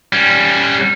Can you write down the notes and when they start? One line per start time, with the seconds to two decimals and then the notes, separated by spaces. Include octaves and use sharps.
0.13 G3 C#4